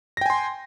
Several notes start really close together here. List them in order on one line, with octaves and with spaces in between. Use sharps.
A#6 G5 G#5 C6